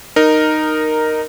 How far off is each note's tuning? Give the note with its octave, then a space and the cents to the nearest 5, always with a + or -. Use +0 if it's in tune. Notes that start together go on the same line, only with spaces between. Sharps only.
D#4 -10 A#4 +0